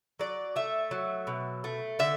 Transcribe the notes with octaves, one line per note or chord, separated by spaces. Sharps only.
F#3 D5
A3 E5
F#3
B2
A3
D3 E5